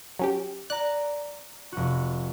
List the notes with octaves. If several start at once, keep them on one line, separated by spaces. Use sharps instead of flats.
F#3 C#4 G4
D5 A#5 F#6
F1 F#4